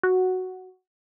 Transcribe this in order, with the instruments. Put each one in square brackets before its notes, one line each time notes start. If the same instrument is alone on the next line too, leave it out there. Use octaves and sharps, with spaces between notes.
[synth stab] F#4